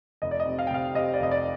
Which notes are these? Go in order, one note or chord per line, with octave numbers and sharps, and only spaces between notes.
F1 D#5
D5
D#5
C3
F5
G5
C3 F5
C3 D#5
D5
F1 D#5
D5